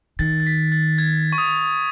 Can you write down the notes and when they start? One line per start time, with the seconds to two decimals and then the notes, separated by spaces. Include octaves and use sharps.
0.19 D#3 A6
0.40 A6
0.47 B6
0.72 A6
0.98 G#6
1.32 C#6
1.38 D#6